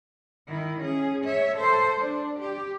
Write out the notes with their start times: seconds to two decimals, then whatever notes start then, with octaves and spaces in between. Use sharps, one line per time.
0.48 D#3 E4
0.81 C#4 G#4
1.25 C#5 E5
1.56 A4 C5
2.01 D4
2.40 G4